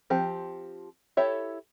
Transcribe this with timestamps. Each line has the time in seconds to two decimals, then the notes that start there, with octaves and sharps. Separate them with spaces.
0.10 F3 C4 G4
1.17 E4 G4 A4 C#5 E5